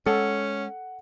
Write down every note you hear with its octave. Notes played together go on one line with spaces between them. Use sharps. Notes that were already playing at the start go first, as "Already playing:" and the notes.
G#3 C#4 A4 F#5